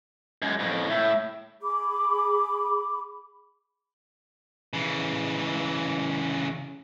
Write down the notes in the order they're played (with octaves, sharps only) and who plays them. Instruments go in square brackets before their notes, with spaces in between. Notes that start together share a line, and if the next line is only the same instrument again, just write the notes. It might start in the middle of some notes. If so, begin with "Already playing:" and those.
[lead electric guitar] F#2 G#3
F2 A2
[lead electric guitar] A2 [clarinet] E5
[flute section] G#4 B5 D6
[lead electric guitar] C#3 E3